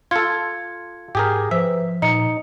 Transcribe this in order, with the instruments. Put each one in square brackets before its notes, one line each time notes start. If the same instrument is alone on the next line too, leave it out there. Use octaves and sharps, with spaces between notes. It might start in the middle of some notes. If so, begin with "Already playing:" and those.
[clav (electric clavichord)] F4 A4 [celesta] G#6 C#7
[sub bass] G#2 [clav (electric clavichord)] G4 G#4 A#4
[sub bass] F3 [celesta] B4 C5 [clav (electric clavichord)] E5
[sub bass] A#2 [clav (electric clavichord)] D#4 [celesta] D#5 A#5 C#7